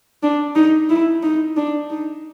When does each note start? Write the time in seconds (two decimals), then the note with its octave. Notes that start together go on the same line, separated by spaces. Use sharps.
0.23 D4
0.56 D#4
0.89 E4
1.23 D#4
1.57 D4
1.90 D#4